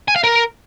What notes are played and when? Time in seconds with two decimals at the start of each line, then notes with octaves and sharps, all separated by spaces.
0.08 G#5
0.16 F5
0.24 A#4